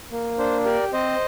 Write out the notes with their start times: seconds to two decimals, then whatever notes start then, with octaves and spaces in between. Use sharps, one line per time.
0.11 A#3
0.38 D4 C5
0.65 G4 A#4 D5
0.93 C4 C5 D#5